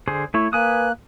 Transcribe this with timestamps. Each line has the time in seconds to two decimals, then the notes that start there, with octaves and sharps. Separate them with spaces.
0.08 D3 G#4 C5
0.34 A3 E4 C#5
0.53 A#3 B4 G#5 D#6 F#6